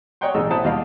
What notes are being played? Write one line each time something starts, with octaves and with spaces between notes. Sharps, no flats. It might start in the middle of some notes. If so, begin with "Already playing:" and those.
C#5 D#5 F#5 G5 C6
A1 A2 G#3 D#4 E6
E4 C5 F#5 A5 D#6
D#2 G3 D#5 F5 B5